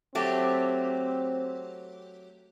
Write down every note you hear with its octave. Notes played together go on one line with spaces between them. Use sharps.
F#3 A3 C4 G4